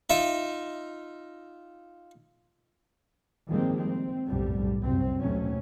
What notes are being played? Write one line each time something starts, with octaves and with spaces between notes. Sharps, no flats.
D#4 F4 D#5 E5
D#3 F3 G3 G#3 A#3 C4
C4
F1 B1 F#2 A2 D3 G3
C2 F#2 C4
D#2 B2 F#3 A3 C#4